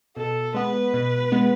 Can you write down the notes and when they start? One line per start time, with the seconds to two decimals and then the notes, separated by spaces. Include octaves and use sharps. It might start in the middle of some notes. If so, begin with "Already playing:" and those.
0.17 B2 A4
0.54 G#3 B3 B4
0.94 B2
1.32 G#3 B3